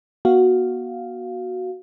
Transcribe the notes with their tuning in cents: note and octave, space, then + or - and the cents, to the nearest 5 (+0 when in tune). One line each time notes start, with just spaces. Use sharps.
B3 -35 F#4 +0 F5 +0